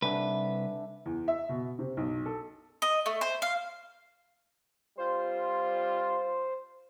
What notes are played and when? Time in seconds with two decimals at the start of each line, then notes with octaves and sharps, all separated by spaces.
0.02 C2 D3 B4 E5 G#5
1.06 E2
1.28 E5
1.49 B2
1.79 C3
1.97 B1
2.26 A4
2.82 D#5
3.06 A3
3.21 C5
3.42 F5
4.97 G3 C4 F4 C5